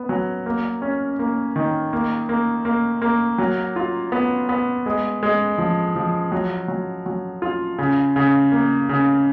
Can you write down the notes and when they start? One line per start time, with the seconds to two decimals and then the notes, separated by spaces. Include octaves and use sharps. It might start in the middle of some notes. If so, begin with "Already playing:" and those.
Already playing: B3
0.09 F#3
0.46 A#3
0.82 C#4
1.19 A#3
1.56 D#3
1.93 A#3
2.29 A#3
2.65 A#3
3.02 A#3
3.38 F#3
3.76 F4
4.12 B3
4.49 B3
4.86 G#3
5.23 G#3
5.58 F3
5.96 F3
6.32 F#3
6.68 F#3
7.06 F#3
7.42 F4
7.78 C#3
8.16 C#3
8.52 A#3
8.89 C#3